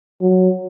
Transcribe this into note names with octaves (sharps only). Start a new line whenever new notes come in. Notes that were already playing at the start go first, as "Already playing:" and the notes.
F#3